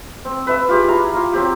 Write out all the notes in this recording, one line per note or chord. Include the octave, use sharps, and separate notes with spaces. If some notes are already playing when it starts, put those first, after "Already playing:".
C4
B4 E5 E6
F4 G4 G#4
E4 A#5
F4 G5
F#3 C4 G4